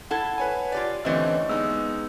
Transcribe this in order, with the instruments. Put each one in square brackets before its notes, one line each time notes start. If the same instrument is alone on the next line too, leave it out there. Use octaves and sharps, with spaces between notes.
[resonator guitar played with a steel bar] E4 A4 [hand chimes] F#5 A5 G#6
[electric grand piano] B4 C#5 G#5
[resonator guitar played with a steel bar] F4 G4 D5
[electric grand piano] D3 E3 C4 [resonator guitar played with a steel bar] G3 A3 [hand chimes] C#4 D#5
[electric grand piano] G#3 B3 D#4 [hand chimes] E6